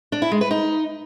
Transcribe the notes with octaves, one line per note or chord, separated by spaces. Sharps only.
D4
E4
G#3
B4
D#4